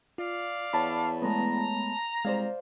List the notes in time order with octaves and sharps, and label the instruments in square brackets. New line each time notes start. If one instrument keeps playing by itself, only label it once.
[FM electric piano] F4 [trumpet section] D5 F5
[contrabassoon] E2 [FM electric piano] C#5 A5 B5
[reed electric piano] G#3 A3 B3 [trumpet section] A#5
[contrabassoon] C2 [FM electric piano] G#3 [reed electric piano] C5 D5 F5